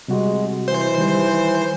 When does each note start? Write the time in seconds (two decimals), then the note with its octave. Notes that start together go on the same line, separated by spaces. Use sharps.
0.08 C3 G3 G#3 F#4
0.68 E3 C5
0.98 D#3 G3